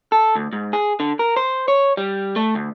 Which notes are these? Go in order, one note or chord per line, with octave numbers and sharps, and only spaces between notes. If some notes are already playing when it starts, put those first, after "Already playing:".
A4
D2
G#2
G#4
D3
A#4
C5
C#5
G3
A3
D2